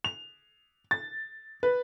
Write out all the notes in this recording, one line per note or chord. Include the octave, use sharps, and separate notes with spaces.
F7
A6
B4